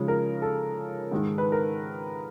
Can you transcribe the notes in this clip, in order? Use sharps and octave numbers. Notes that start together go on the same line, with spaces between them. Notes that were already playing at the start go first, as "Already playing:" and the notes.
Already playing: C#3 F3 G#3 C#4
A#4
A4
G#2 D#3 G#3
B4
A#4